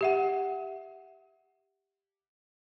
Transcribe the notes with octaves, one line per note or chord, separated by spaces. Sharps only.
G4 E5 F#5